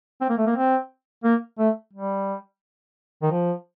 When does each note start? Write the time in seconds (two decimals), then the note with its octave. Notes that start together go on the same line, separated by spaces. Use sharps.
0.21 C4
0.30 A#3
0.38 A3
0.46 A#3
0.56 C4
1.24 A#3
1.59 A3
1.93 G3
3.22 D#3
3.31 F3